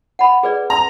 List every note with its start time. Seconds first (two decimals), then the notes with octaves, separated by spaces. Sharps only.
0.19 F#5 B5
0.43 G#4 B4 D5
0.70 A#5